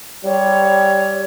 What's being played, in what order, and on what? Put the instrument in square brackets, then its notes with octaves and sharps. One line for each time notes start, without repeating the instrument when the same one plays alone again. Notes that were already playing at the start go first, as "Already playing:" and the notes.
[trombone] G3 [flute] C#5